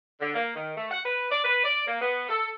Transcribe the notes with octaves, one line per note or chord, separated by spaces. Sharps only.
D3
A#3
D#3
A3
F#5
B4
D5
B4
D5
A#3
B3
A4